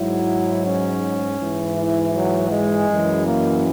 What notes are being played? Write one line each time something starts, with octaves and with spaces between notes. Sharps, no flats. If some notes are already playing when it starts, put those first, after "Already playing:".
Already playing: G#2 F#3 E4
C#4
G#2 E3
E4
F#3
G#3
F#2 E3
A#3